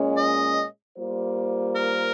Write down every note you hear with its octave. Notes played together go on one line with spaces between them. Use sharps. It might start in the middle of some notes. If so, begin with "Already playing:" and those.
Already playing: A#2 G#3 C#4
D#5
G3 A#3 F4 C5
A#4